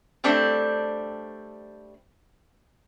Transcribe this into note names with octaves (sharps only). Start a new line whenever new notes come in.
G3 A3 C4 D4